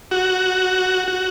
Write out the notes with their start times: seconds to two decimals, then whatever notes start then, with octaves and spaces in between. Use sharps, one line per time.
0.11 F#4
1.08 F#4